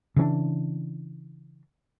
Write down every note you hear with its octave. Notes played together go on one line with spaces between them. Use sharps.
C#3 E3 C4 D4